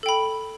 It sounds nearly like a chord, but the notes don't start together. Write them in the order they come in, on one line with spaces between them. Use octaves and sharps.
A4 G5 B5